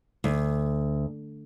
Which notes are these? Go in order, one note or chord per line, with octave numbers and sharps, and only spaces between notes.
D2